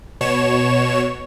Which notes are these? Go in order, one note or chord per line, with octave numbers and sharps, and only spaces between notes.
B2 C#5 E7